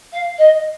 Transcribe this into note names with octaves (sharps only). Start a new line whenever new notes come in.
F5
D#5